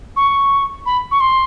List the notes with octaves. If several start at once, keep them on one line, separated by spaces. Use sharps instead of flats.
C#6
B5
C#6
C6